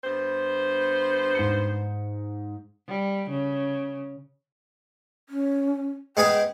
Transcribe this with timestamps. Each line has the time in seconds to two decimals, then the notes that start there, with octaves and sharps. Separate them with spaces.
0.04 G2 B3 C5
1.35 G#2 C#7
2.88 G3
3.31 C#3
5.29 C#4
6.17 G#3 B3 G#4 G5